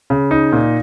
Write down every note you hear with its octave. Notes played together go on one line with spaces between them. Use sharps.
C#3
D#4
A#2